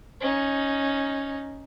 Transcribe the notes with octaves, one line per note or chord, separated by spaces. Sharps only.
C#4 D#4